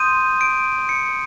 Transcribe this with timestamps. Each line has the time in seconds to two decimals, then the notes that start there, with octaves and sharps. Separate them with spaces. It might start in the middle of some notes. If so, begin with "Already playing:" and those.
Already playing: C6 D#6 G6 D#7
0.41 D7
0.89 C#7